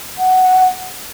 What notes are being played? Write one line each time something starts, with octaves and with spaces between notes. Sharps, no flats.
F#5